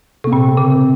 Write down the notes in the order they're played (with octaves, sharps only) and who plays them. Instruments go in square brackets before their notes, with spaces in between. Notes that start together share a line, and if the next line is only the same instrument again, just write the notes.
[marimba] C3 [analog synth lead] A#3
[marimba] A#2 [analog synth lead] C4
[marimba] C#3